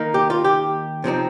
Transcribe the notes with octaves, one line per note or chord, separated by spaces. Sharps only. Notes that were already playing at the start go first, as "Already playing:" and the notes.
Already playing: D#3 A#3 D#4
G4
F4
G4
C3 F3 C4 D#4